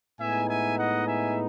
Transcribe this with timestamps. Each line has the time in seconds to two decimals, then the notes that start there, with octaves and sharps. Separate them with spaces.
0.20 A2 G#3 B3 D#4 E5 G#5
0.49 E5 G#5
0.78 D#5 F#5
1.06 E5 G#5